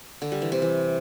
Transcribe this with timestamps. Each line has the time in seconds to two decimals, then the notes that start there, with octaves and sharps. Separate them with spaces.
0.22 D3
0.32 G3
0.42 E3
0.52 C3
0.62 E3